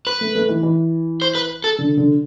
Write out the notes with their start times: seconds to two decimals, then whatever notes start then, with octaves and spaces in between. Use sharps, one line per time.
0.07 B4
0.21 A3
0.35 A3
0.49 E3
0.63 E3
1.22 C5
1.35 B4
1.64 A4
1.78 D3
1.97 D3